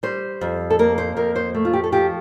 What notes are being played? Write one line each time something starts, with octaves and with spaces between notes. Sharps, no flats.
G3 C5
F2
A4
A#3 A#4
C5
F2 A#4
C5
A3
F4
G4
A4
F3 G4